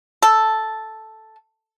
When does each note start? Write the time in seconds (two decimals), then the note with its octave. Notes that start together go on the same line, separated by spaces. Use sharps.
0.22 A4